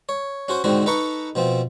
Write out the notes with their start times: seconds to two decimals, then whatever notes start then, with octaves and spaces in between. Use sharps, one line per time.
0.09 C#5
0.48 C#4 F#4 C5
0.64 G#2 D3 D#3 C4 F#4
0.86 D#4 A4 B4 A#5 C#6
1.35 B2 F3 C4